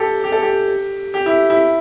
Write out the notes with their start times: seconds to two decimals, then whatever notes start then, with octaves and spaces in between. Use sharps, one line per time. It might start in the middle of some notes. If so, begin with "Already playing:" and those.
Already playing: G4 A4
0.24 G4
0.32 A4
0.42 G4
1.14 G4
1.26 E4
1.50 E4